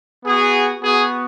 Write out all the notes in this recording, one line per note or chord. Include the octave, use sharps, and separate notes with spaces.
B3 F#4 G#4
B3 F#4 G#4